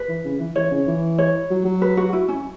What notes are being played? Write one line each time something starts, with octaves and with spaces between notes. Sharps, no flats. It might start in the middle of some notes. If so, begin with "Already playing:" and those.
Already playing: B4
E3
C#3
E3
E3 C#5
C#3
E3
C#5
F#3
F#3
B4
F#4
E4
C#4